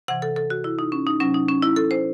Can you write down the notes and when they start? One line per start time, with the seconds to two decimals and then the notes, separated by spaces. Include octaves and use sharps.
0.08 C3 E3 F#5
0.22 A4
0.36 A4
0.50 F#4
0.64 E4
0.79 D#4
0.92 C#4
1.07 D#4
1.20 C3 F#3 C#4
1.34 D#4
1.48 C#4
1.63 E4
1.76 A4
1.91 C5